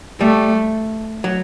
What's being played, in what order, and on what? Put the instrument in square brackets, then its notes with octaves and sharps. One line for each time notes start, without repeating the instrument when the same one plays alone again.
[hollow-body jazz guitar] G3 [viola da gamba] A3
[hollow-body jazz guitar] F#3